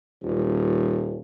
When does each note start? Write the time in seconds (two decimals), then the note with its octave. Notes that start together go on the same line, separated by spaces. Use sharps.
0.22 D#1